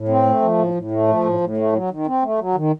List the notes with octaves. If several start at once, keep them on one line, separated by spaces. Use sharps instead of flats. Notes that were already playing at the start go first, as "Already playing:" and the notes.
Already playing: A2
C4
A3
F3
A2
A2
A3
F3
A2
A2
A3
F#3
D#3
C4
A3
F#3
D#3